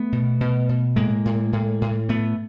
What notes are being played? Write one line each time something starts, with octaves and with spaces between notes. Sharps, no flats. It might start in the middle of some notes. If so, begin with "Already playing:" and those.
Already playing: A3 B3
B2
B2
B2
A2 G#3 A#3
A2
A2
A2
A2 A3 B3